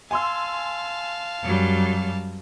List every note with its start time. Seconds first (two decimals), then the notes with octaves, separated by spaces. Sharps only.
0.11 F5 G#5 A5 C6 E6
1.43 F#2 F#3 G3